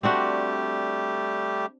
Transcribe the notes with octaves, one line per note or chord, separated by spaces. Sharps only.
G3 A3 C4 D4 F#4 G4